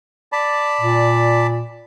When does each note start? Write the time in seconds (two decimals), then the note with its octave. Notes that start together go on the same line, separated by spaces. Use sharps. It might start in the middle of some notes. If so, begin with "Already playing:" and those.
0.32 D5 A5 B5
0.81 A#2